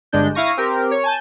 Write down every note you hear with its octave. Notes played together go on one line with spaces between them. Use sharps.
G1 G#3 D4 G6
E4 F5 C#6 A#6 D#7
C4 G4 A#4
C#5
G#5 A5 G6